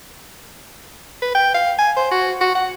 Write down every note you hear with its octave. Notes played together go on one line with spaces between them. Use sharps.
B4
G5
F5
G#5
C5
F#4
F#4
F#5